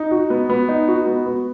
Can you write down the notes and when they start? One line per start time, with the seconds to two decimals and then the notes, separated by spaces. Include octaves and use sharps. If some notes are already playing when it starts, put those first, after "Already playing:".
Already playing: D#4
0.11 F#4
0.30 B3
0.50 B3
0.69 D#4
0.88 F#4
1.07 B3
1.26 B3